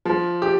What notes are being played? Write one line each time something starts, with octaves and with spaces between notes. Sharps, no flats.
F3
G4